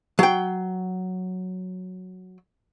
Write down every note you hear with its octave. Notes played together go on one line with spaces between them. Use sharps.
F#3 G5